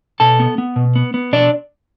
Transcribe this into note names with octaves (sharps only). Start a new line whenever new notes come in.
B2 A4 A5
B3
B3
B2
B3
B3
B2 D4 D5